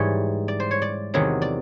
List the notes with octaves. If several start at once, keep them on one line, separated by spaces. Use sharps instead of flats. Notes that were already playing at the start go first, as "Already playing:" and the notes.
Already playing: G#2 E3 G3 C#5
D5
C5
C#5
D5
E2 C3 D#3 F#3
D5